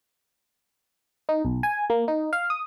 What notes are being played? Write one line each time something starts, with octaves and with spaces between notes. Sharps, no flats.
D#4
B1
G#5
A#3
D#4
F5
D#6